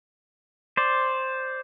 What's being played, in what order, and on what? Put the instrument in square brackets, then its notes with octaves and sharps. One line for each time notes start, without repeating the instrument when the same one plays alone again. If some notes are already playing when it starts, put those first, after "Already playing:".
[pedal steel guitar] C5 D5